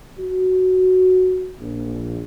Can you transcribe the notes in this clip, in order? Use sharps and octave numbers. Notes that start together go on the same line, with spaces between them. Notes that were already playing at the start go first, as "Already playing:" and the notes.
F#4
A#1